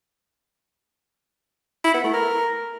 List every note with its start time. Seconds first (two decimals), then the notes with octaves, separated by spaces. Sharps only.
1.85 E4
1.94 B3
2.04 A3
2.14 A#4